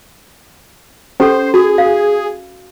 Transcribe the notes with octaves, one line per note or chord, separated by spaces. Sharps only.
C#4 G4 A4 C5
F#4 G#4
F5